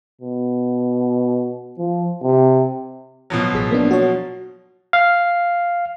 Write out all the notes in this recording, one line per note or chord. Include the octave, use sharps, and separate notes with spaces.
B2
F3
C3
B2 F3 F#3
A1 G#4 B6
A#3 B3 D4
F#4 C#5
F5